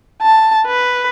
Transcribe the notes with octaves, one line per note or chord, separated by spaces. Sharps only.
A5
B4